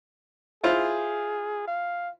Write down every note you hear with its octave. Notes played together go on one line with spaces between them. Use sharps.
E4 F4 G#4 C5
F5